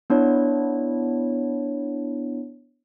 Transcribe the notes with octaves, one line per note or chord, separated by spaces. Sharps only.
B3 D4 E4 C#5